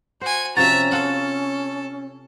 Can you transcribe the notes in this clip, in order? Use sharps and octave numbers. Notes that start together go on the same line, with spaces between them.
F#4 C5 G#5
C3 F3 C#4 F#4 E5 A#5 A6
F4 A4 F#5